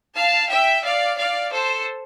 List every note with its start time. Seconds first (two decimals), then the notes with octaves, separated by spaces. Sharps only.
0.15 F5 A5
0.50 E5 G5
0.84 D5 F5
1.18 D5 F5
1.52 A4 C5